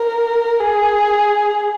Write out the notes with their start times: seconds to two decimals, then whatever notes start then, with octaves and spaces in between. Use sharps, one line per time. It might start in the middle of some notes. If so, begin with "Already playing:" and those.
Already playing: A#4
0.61 G#4